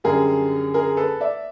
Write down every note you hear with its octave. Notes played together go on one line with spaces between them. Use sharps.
F#2 D3 G3 G#4 A#4
G#4 A#4
A4 B4
D5 E5